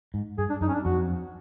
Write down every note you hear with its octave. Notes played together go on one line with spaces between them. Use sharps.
G#2
G2 G#4
D4
F#2 D#4
C#4
D4
F2 F#4